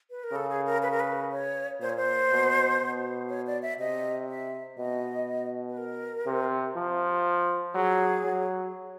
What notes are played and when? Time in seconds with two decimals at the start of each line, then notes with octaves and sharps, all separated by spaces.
0.10 B4
0.24 A#4
0.32 C#3 A4
0.49 G#4
0.66 A#4
0.82 B4
0.91 A#4
1.00 B4
1.32 C#5
1.81 A#2 C5
1.89 C#5
1.96 C5
2.31 B2
2.80 B2
3.29 C#5
3.46 D5
3.62 E5
3.79 C3 D#5
4.28 E5
4.78 B2 D#5
5.69 B4
5.77 A#4
6.26 C3
6.76 F3
7.75 F#3 G#4
8.25 F#3